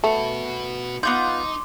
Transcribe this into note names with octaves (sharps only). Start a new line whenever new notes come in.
A3 F#4 B4
B3 D#4 F4 C6 D6 G6